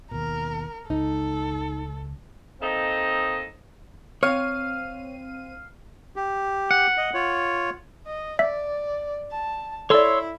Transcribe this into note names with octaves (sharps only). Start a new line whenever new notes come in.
D#2 B2 A#4
C#2 D#4 A4
A#3 C4 D#4 A4 D#5
C4 C#5 F5 D#7
G4
F#5
D#5
F4 C#5
D#5
D5 E5
A5
E4 A4 C#5 D5 C6 E6